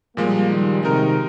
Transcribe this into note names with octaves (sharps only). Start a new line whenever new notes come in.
A#2 F3 G3 G#3 A#3
D#3 G3
C3 D#3 G#3 D#4 A#4